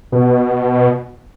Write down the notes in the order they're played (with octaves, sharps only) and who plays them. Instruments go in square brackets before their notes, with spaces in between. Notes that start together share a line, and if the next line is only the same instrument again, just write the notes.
[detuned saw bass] B2